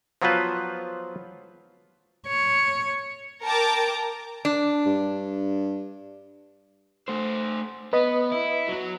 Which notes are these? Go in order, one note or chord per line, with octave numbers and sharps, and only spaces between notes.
F3 F#3 B3 F4 B4 C5
C#5
A#4 G5 A5 A#5 D6
D4
G2
A3 C5
B3 B4 D#5 B5
E4
F#3 F#4